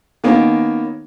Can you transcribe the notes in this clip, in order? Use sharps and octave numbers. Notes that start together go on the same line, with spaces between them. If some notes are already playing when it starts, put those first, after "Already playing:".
D#3 A#3 B3 C#4